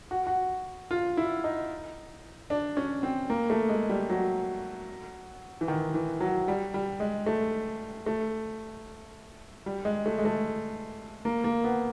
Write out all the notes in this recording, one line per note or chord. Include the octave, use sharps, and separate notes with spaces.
F#4
F#4
F4
E4
D#4
D4
C#4
C4
A#3
A3
G#3
G3
F#3
E3
D#3
E3
F#3
G3
G3
G#3
A3
A3
G3
G#3
A3
G#3
A3
A#3
A#3
B3